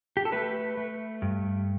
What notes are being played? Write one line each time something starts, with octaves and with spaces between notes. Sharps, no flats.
G4
A4
A3 B4
A3
G2